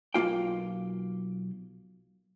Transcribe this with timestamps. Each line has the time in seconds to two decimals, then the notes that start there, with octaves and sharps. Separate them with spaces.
0.14 B1 C3 A#3 F4 G5